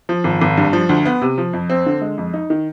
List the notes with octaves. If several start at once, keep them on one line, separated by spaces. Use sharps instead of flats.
F3
G#1
G#1
G2
F3
D2
B3
C3
F3
F2
C4
D3
G#3
F2
D#4
D#3